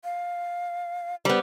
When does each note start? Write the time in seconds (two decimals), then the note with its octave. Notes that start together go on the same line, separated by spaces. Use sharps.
0.04 F5
1.25 G3 B3 C5